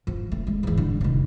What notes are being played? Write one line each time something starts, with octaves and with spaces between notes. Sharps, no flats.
F3
A3
G#3
E2 G#2
D3
F1 D#3